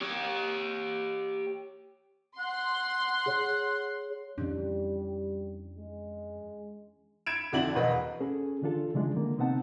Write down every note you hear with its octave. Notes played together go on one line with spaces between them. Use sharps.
G4 C#5
F#5 C6
G#4 C#5
F2 E3 G3 C#4 D4
G#3
B5 G#6 D7 E7
F2 D3 D4 E4 F#4 F#7
E1 B4 D#5
C#4 G#4 A4
D3 E3 D4 F4 A4
C#3 E3 F3 G#3 D4
D3 A#3
C3 B3 C4 D#4 F#5 A5